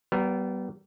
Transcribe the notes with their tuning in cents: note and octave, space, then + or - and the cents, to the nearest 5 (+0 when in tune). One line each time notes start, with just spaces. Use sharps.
G3 -30 B3 +0 A#4 +0